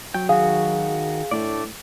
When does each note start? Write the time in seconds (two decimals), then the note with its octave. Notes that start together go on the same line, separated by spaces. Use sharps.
0.14 F#3 G5
0.29 D#3 F#4 G#4 F5
1.31 A2 A3 D4 D5